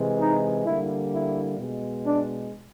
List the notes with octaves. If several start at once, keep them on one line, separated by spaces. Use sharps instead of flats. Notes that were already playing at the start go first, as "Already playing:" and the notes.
Already playing: C3 E3 G#3
D#4
D3 G3 A#3 E4
E4
B2 G#3
D4